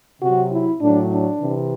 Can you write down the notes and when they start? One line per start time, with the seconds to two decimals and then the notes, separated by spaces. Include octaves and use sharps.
0.21 C3 F#3 F#4
0.51 E4
0.80 A2 F#3 D4
1.10 D4
1.39 C3 E3